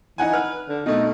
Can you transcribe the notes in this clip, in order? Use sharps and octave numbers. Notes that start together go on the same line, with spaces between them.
E3 D#4 F#5 G#5
B4 F6
D3
B2 A3 D#4